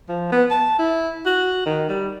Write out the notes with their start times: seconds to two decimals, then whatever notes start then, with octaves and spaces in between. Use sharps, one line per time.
0.08 F3
0.32 B3
0.51 A5
0.79 E4
1.25 F#4
1.66 D#3
1.89 G3